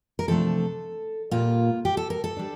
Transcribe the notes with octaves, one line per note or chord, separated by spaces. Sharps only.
A#4
C3 F3 A3 D4 A4
A#2 G3 A#3 F4
G4
A4
A#4
A4
G3 D4